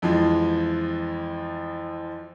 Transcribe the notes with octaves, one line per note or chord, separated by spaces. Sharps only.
F2 E3 F3 G#3